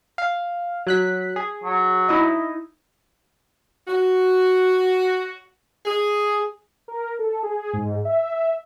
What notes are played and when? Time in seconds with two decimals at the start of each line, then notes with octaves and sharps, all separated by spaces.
0.18 F5
0.87 F#3 F#6 B6
1.36 G#4
1.64 F#3
2.09 D#4 E4 D#5
3.87 F#4
5.86 G#4
6.88 A#4
7.19 A4
7.43 G#4
7.73 G#2
8.05 E5